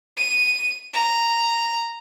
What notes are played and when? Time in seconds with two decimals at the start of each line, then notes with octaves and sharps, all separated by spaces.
0.17 D#7
0.93 A#5